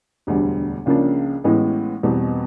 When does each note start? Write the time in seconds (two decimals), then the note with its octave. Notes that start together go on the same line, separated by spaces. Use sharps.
0.27 E1 D2 D3 G3
0.86 C#2 C#3 F3 A#3 D4
1.44 A1 A2 E3 G#3 B3
2.03 E2 B2 G3 C4